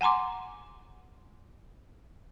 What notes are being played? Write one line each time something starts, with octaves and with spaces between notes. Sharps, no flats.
F#5 G#5 A#5 C6 D6